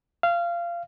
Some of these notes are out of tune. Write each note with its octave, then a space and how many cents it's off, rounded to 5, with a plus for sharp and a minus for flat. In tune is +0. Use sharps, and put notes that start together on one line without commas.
F5 -20